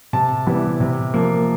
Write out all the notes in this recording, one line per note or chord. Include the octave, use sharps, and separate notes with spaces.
C3 A5
E3 G3 B3
C3
F3 A#3